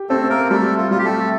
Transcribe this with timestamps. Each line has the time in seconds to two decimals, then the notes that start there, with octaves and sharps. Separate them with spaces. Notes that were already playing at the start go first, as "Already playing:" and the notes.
Already playing: G4
0.09 A3 C4 A4
0.30 A#3 A#4
0.50 G3 A3 A4
0.78 F4
0.91 G3 F4
0.98 G4
1.05 A3 A4